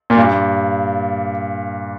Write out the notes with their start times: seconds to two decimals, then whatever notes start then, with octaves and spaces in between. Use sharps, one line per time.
0.10 A#2
0.17 G2